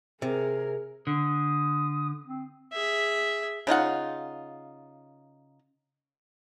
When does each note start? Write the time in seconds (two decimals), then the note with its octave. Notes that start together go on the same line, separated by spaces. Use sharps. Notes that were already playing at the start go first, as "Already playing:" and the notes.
0.22 C3 G#4 A#4
1.07 D3 D#6
2.26 C4
2.73 G#4 E5
3.67 C#3 D#4 F4 F#5